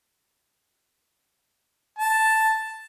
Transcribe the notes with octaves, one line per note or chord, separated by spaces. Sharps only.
A5